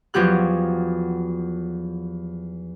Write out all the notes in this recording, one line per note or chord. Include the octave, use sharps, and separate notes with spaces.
E2 F3 F#3 G4 F#6